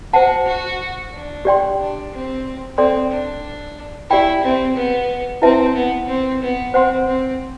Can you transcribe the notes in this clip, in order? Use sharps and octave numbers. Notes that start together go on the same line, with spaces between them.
F#4 C5 F#5 A5
F#4
D4
G4 D5 G5 C6
D4
C4
C4 A4 D5 G5 C6
D4
E4 G4 D5 G5 B5
C4
B3
C4 E4 B4 E5 A5
B3
C4
B3
C4 C5 F#5 C6
C4